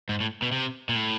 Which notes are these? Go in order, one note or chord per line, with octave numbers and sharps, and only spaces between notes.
G#2
A2
B2
C3
A#2
A2